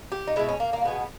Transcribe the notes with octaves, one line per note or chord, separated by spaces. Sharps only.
G4
D#4
B2 G#3 E4
C#4
A#3
A#3
B2 G#3 B3